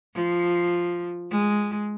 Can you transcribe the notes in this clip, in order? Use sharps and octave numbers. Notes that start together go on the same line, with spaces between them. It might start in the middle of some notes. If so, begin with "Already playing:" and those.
F3
G#3